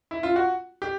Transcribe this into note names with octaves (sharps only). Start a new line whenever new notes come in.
E4
F4
F#4
G4